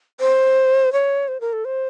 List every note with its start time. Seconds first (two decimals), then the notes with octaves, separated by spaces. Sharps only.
0.20 C5
0.93 C#5
1.28 C5
1.41 A#4
1.53 A4
1.65 C5